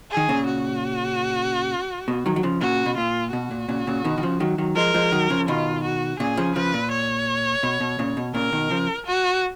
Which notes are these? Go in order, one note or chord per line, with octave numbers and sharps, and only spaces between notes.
G#4
D#3
A#2 C#3
F#4
B2
D#3 F#3
F#3
C#3 F3
A#2 C#3 F#4
B2
A#2 F4
B2 F#4
A#2
A#2 C#3
A#2 C#3
B2 D#3
D#3
C#3 F3
D#3 F#3
D#3 F#3
F3 G#3 A#4
F3 G#3
D#3 F#3
C#3 F3
B2 D#3 F4
F#4
A#2 C#3 G#4
C#3 F3
C#3 F3 B4
A#2
C#5
B2
B2
A#2 C#3
B2
A#2 C#3 A#4
B2 D#3
C#3 F3
F#4